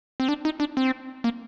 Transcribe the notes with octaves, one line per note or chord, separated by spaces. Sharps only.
C4
D4
D#4
D4
C4
A#3